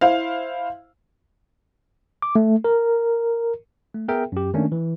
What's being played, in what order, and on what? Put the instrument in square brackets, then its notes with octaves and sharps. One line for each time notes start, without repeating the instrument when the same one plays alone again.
[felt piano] E4 C5 F5
[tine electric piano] D6
A3
A#4
A3
B3 G#4 A#4 E5 G5
F#2 G4
D#3 A3 A#3 C#4 D4
E3